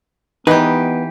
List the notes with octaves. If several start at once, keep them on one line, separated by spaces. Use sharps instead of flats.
E3 B3 D#4 G4 B4